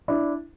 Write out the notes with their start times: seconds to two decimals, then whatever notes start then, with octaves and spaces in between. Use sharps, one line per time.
0.08 D4 E4